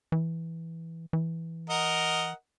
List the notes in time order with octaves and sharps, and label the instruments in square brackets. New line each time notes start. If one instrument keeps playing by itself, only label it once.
[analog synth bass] E3
E3
[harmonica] A#4 D#5 F#5